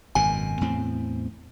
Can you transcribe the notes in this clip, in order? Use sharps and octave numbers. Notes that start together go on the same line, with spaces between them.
G#1 F#2 B2 G#5
E2 A2 C4